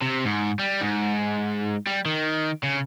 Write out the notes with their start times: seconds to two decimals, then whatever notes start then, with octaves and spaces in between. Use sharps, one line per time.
0.02 C3
0.25 G#2
0.59 G3
0.81 G#2
1.87 G3
2.06 D#3
2.63 C#3